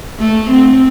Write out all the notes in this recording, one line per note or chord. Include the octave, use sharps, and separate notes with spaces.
A3
C4